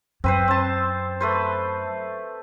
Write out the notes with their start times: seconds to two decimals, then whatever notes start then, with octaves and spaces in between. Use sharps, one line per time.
0.24 F#2 C4 B4 C5
0.48 C4 A5
1.20 A3 B4 C5